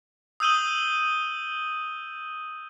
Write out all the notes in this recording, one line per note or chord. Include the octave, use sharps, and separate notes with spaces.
D#6 E6 G6 D#7 F#7 G7